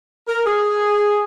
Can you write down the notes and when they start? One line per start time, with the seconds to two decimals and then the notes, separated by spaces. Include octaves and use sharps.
0.27 A#4
0.46 G#4